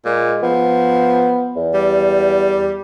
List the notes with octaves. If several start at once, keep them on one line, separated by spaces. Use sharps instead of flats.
A#2 G#3
F3 B3
E2
G3